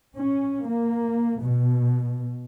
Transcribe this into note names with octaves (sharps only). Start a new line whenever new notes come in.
C#4
A#3
B2